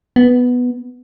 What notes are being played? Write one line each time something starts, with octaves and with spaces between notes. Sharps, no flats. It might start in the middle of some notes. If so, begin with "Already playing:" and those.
B3